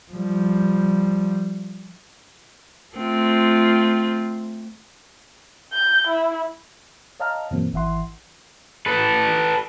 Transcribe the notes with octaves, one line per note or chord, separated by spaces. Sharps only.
F3 G3
A3 C4 F4
G6
E4
C#5 D#5 F5 A5 A#5 F6
G2 B2 E3 F#3 A#3 C4
G#1 E3 E5 F#5 C6
A4 B4